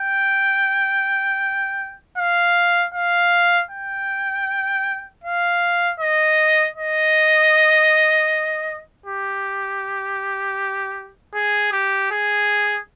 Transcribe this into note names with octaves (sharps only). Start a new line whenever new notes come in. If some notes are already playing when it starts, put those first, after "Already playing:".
Already playing: G5
F5
F5
G5
F5
D#5
D#5
G4
G#4
G4
G#4